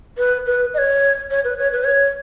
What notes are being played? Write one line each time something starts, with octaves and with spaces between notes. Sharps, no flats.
B4
B4
D#5
C#5
C#5
B4
C#5
B4
C#5